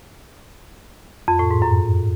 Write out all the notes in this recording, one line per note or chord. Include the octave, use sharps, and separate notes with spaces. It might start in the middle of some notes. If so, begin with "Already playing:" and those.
F2
A2
G#2
F#2